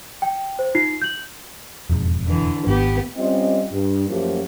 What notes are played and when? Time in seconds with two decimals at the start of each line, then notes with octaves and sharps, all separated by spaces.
0.22 G5
0.59 C5
0.75 D#4 F4 C7
1.02 G6 F#7
1.90 E1 F2 G#2
2.27 D3 E3
2.67 G#1 B3 G4
3.17 G3 C4 C#4 F4 D#5
3.71 G2
4.08 F#2 F3 F#3 A3 A#3 G4